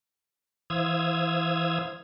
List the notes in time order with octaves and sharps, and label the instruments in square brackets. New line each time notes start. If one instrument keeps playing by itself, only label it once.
[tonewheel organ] E3 C5 F5 D#6 E6 G#6